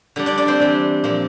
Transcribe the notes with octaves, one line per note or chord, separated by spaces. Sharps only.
D3 G3 D4
D4 D5
D4 D5
C4 C5
E3 G3 C4
A#2 F3 C4